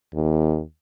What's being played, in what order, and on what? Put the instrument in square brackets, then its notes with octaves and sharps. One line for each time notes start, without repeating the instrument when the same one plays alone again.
[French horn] D#2